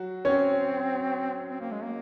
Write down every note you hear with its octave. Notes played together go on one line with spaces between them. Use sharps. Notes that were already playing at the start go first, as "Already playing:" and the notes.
Already playing: F#3 F#4
C4 C#4 C#5
C4
A#3
G#3
A#3